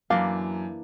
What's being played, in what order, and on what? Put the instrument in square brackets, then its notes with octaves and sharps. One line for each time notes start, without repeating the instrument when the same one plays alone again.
[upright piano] F#2 [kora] E3 A#3 D4 [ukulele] F5